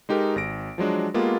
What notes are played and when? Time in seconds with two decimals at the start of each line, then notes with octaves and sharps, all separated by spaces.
0.09 G#3 D#4 G4 A4 A#4
0.36 G#1 A#6 D7
0.78 F3 F#3 G#3 D4
1.14 G#3 A#3 B3 F4 G4 A4